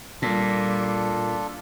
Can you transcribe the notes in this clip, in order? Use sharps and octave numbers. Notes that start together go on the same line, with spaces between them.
A#2 G3 D4 F4 A4